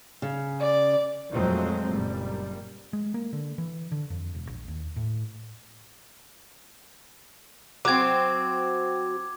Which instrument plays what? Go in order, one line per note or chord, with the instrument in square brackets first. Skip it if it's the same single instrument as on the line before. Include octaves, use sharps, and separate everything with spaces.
[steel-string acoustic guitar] C#3
[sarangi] D5
[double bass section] F2 A#2 F#3 G#3 A3 C4
F#1 A#2 G3
[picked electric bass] G#3
A#3
D3
E3
D3
F2
E1
A#1
D#2
A2
[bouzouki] F#3 C4 [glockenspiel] D6 G#6